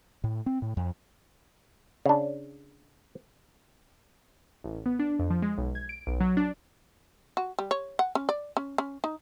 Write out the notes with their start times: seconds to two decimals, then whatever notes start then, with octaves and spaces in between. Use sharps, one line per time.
0.24 A2
0.46 C4
0.62 A2
0.77 F2
2.06 C#3 D4
4.64 A1
4.86 B3
4.99 D4
5.19 F2
5.30 F3
5.42 G#3
5.58 B1
5.75 G#6
5.89 D7
6.07 B1
6.21 F#3
6.37 D4
7.37 F#4
7.59 G3
7.71 C#5
7.99 F#5
8.15 C#4
8.29 D5
8.57 C#4
8.78 C#4
9.04 D#4